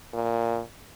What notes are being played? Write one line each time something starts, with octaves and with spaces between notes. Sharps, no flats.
A#2